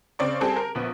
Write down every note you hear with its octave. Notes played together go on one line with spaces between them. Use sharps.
C#3 C4 D5 C#6
G3 C4 G#4 A4
A#4
A#1 B3